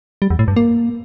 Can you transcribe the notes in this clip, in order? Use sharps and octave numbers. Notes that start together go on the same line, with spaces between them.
G3
E2
A2
G2
A#3